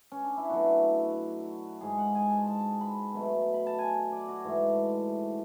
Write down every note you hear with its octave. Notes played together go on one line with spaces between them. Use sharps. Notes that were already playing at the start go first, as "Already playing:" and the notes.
C#4
D4
E4
B2 F#3 A3 F#4
G#2 G#3 G#4
F#5
G#5
A5
A5
B5
B2 F#3 A3
B5
A5
G#5
D5
F#4
G#2 E3 A3